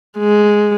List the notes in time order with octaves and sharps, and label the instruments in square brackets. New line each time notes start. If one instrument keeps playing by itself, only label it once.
[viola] G#3